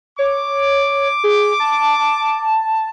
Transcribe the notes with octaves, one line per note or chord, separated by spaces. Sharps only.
C#5 D6
G#4
A5